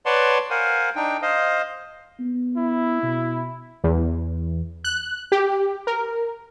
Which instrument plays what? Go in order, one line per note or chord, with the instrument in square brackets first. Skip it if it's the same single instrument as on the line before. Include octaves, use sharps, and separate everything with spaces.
[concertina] B4 C#5 D5 F#5 A5 C6
A#4 C5 F5 F#5 G#5
D4 D#4 G5
C5 D#5 F5
[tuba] B3
[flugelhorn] E4
[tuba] B2
[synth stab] E2
F#6
G4
A#4